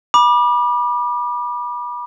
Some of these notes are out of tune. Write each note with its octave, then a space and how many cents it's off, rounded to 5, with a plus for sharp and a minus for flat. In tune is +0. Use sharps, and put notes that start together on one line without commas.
B5 -30 D6 +25